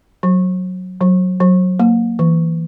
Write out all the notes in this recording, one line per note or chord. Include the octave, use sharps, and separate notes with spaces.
F#3
F#3
F#3
A#3
E3